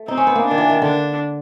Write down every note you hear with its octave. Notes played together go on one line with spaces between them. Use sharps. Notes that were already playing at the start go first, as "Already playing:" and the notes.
Already playing: A3
C4 D#4
C#4
B3
A#3
D4
D#3
E3
D#3
D3 D4